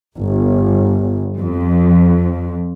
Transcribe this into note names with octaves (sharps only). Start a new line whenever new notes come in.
G1
F2